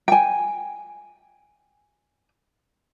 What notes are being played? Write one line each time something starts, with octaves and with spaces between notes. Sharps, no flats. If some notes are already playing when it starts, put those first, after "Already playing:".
G5 G#5